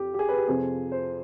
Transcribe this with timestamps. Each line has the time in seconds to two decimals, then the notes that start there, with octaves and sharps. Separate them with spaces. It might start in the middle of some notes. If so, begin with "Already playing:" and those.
Already playing: F2 G4
0.14 G4
0.19 G#4
0.29 B4
0.38 G4
0.48 F2 C3 F3 G#4
0.92 C5